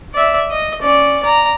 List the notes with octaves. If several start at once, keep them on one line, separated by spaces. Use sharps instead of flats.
D5 E5
D#5
C#4 D5
D5 A#5